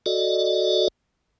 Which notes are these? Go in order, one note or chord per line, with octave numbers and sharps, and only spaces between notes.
F#4 A4 D5 D#5